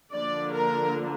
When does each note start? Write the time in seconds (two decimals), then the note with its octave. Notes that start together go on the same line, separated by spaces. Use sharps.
0.12 D3 F3 A#3 D5
0.53 A#4